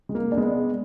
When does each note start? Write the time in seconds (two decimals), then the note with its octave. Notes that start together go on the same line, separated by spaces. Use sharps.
0.09 G#3
0.15 A#3
0.32 D4
0.37 G#3 B3